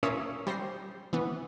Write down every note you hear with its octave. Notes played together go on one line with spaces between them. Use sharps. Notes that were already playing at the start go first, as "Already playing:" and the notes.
A#2 C#4 E5 F5 D#6 A6
G3 C5 A#6 C7
E3 B3